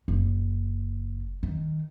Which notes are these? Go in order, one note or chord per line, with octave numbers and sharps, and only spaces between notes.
F#1
D#3